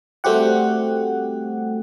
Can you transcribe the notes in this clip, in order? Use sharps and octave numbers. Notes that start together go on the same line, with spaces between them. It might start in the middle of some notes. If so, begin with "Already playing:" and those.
G3 A3 C4 F#4 G4 F#5